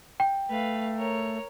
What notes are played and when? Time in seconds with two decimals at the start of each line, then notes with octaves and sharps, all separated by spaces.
0.20 G5
0.49 A3 B4 F5
0.97 A#4 C#5